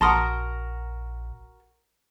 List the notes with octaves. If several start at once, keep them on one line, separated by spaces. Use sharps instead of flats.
A#1 F#4 A#4 A5 A#5 C6 D#6